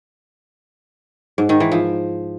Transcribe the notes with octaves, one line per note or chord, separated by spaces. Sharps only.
G#2
D#3
E3
F3